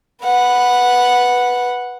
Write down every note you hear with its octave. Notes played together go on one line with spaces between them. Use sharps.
B4 F#5